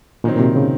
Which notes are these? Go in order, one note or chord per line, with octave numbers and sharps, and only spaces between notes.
A#2 D#3 F#3 C4
A#2
C3
C#3